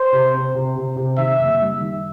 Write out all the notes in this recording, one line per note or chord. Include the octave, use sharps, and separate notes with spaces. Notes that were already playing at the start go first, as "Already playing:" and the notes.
Already playing: C5
C3
C4
C3
C3
C3
D#3 E5
F#1
G3
D#3